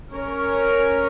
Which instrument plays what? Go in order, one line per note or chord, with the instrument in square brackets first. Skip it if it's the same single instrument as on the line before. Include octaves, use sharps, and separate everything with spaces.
[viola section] C#4 A#4 C#5